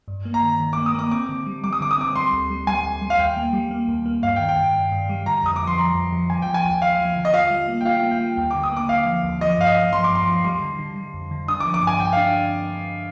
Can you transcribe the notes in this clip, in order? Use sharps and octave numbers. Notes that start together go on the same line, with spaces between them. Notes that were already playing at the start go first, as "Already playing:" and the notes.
G2
A#3
A#5
D#3
D#3
A#3 D6
D#6
A#3 D6
C4 D6
D3
G3
G3 D6
D#6
D3 D6
D#6
C4 D6
G3 C6
D2
G3
G3 G#5
D2
G3
F5
D#2 G5
A#3
G3
A#3
D#2
A#3
G2 F5
D#3 G5
G5
G2
G2
G2
G3
D3 A#5
F2 D#6
D6
F3
C6
F3 A#5
F2
F3
F3 G#5
F3 G5
G#5
D#2
D#2 F5
F3
D3
D#5
F4 F5
G3
A#3
G5
F4 F5
A#3
G5
G3
D#2 G5
D3 D6
D#6
A#3 D6
D3 F5
F3
D#2
F3 D#5
G2 F5
D#5
F3
F3 C6
D6
G2
C6
F3
G3 C6
D3
D3
G3
F2
D3
D4 D#6
D6
F3
D6
G2 G#5
G2 G5
D4 F5